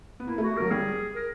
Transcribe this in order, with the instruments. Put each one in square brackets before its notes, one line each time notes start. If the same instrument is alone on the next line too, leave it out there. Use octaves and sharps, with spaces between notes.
[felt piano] B3
[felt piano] A#3 [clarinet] E4
[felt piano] A3
[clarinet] F#4
[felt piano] G#3
[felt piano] F#3 [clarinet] A#4
[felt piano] G3 [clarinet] G#4
[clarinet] A#4